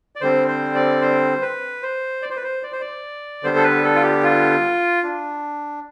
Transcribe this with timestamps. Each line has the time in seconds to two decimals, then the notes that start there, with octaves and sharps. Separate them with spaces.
0.16 D5
0.21 D3 G3 C4 C5
0.48 C5
0.75 D5
1.02 C5
1.42 B4
1.83 C5
2.22 D5
2.30 C5
2.36 B4
2.43 C5
2.63 D5
2.72 C5
2.81 D5
3.43 D3 G3 B3 C5
3.57 A4
3.64 B4
3.83 A4
3.95 F4
4.03 G4
4.23 F4
5.04 D4